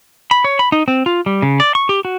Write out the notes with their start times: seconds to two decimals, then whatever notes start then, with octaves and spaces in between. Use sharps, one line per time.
0.31 B5
0.44 C#5
0.59 B5
0.72 D#4
0.88 C4
1.06 F4
1.26 G3
1.42 C#3
1.60 D5
1.75 C#6
1.89 G4
2.05 F#4